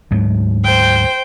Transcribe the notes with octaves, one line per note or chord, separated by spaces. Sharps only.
D2 G#2 F#3
C5 G5